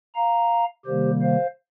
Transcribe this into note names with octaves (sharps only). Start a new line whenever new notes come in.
F5 A#5
C3 D#3 G3 A#3 G4 C5
C5 F5